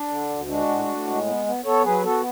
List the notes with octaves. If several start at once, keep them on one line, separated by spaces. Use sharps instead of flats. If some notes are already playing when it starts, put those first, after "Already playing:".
Already playing: D4
D3
D2
G#3 D4 F#4
A2
A2
G#3
B3
B3
B3 A4 C#5
F#3 G#4 B4
B3 F#4 A4